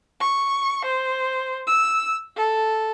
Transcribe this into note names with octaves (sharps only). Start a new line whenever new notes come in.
C#6
C5
E6
A4